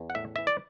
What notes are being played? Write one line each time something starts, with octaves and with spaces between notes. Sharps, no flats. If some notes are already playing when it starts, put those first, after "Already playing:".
Already playing: E2
F#5
A2 E5
E3 E5
D5